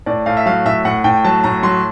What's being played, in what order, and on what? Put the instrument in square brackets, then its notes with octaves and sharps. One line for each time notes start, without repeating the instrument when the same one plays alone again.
[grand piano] A2 D5
A2 F5
E5
F#3 F5
A2 E5
A2 F#5
A2 G5
F#3 A5
A2 A#5
F#3 C6